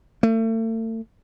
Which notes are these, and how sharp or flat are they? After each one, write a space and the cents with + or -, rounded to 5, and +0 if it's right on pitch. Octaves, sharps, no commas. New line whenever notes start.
A3 +40